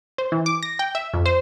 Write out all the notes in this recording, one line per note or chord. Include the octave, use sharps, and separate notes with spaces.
C5
E3
D6
A#6
G5
E5
F2
C5